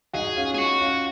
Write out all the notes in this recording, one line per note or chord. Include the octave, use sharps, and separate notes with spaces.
D#4 F#4 G#4
C#4 F4
G#4
F#4
C#4 F4